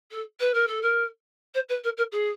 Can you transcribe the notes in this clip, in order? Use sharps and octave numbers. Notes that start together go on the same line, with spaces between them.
A4
B4
A#4
A4
A#4
C5
B4
A#4
A#4
G#4